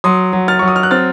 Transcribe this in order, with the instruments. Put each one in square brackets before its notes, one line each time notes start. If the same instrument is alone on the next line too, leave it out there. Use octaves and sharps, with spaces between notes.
[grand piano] F#3 C6 D#6
F#3
F6 A6
F#3 C#6
D#6
F6
F#6
C4 F6 A6